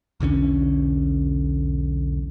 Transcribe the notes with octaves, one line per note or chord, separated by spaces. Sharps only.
B1 E2 D3 C#4